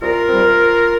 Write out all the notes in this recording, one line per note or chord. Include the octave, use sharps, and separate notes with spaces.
C2 F4 A#4
C3 G3 C4